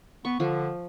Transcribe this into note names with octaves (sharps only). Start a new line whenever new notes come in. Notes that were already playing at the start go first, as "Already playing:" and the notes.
B3 C#6
D3 F3